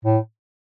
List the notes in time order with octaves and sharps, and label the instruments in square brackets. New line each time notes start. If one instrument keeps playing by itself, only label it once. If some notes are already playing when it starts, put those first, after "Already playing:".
[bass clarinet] A2